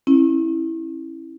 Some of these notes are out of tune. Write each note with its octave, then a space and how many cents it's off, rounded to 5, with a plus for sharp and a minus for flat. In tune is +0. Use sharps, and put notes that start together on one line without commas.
C#4 -35 E4 -5